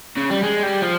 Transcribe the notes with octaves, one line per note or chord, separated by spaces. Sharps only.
C#3
G3
G#3
G3
F3